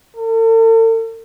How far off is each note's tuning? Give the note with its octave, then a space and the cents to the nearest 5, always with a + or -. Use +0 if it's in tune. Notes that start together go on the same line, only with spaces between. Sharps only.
A4 +45